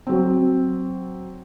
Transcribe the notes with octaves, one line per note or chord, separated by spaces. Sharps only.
F#3 C4